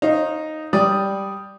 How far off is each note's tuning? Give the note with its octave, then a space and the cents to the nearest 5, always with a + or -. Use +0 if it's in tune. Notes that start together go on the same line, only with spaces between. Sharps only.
D#4 +0 C#5 -45 F5 +0
G3 +0 D5 +0 D#6 +0